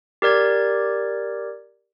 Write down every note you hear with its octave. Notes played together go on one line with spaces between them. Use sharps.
G4 A#4 D5 G#6